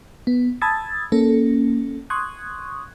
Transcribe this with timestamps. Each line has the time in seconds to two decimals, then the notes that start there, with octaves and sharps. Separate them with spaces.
0.27 B3
0.62 A5 B5 D#6 E6 G#6 A6
1.12 A#3 C#4 A4
2.10 C6 C#6 D#6 F#6 G#6